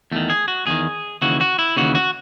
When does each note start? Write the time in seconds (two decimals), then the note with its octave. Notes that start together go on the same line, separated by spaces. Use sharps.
0.12 E2 D#3 A3
0.30 G#4
0.48 F#4
0.67 E2 D#3 G#4
1.22 D#2 C#3 E3 F#4
1.41 F#4
1.59 E4
1.77 D#2 C#3 E3 F#4
1.95 F#4